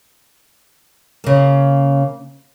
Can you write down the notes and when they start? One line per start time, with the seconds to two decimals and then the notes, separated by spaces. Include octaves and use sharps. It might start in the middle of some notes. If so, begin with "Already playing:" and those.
1.24 C#3 A#3